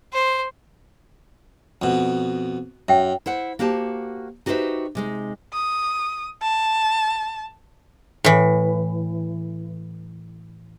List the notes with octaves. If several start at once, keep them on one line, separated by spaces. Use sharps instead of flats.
C5
F2 B2
F#2 E5 G5
E4 C5 F#5
A#3 F#4 G4 C5 A5
D#4 F#4 G4 B4 C5 E5
C3 G#3 D#4
D#6
A5
A2 E3